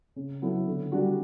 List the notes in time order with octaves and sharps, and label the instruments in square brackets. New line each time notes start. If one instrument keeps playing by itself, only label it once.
[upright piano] C#3
F#3 B3 E4 A4
D3
G3 D4 F#4